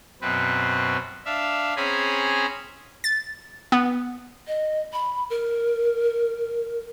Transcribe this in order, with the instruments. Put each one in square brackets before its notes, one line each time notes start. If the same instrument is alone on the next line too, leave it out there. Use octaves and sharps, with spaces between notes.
[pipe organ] F#2 B2 C4 B4
D4 E5 F5
C4 C#4 G#4 G#5 A#5 B5
[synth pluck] A6
B3
[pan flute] D#5
B5
A#4